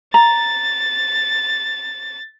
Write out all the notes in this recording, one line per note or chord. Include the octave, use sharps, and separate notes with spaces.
A#5 A6